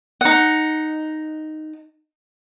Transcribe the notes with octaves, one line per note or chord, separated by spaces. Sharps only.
D#4 F#5